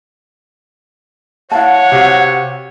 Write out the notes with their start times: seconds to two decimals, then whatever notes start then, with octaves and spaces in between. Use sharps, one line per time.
1.52 E4 C#5 F5 F#5 A5
1.92 C3 F#4 F5